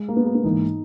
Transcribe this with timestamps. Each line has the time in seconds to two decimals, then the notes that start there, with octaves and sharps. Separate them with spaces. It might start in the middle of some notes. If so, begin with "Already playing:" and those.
Already playing: G#3
0.08 A#3
0.16 B3
0.26 A#3
0.35 B3
0.44 G#2 E3 A#3 D#4